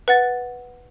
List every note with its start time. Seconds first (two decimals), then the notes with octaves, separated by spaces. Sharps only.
0.08 B4 F#5 A6